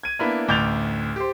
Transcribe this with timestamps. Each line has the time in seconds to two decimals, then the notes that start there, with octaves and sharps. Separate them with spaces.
0.03 G#6 D#7
0.19 A#3 B3 D4 E4
0.48 A1 D2 D6 G6 A6 F7
1.16 G4 C5